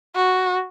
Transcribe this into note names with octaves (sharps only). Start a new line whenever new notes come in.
F#4